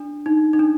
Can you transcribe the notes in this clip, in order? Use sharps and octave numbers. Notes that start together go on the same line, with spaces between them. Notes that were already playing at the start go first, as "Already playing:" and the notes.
Already playing: D4
D#4
D#4
D4